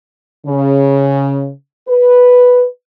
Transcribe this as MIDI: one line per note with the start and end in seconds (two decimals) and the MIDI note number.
0.47 1.51 49
1.88 2.64 71